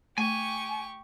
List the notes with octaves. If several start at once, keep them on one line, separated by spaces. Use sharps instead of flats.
A3 G4 G#5 C#6